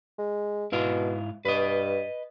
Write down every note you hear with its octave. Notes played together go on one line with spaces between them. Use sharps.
G#3
G#2 B2 E4 F5
G2 B4 D#5